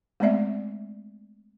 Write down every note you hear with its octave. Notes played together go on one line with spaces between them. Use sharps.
G#3 A3 B3 C4 D5 E5